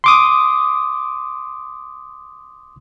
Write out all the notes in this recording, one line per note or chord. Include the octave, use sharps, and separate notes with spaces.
C6 D6 D#6